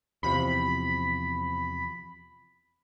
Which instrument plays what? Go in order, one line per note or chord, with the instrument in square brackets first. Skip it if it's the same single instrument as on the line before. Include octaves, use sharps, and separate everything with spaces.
[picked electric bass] E2 C3 F3 [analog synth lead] B5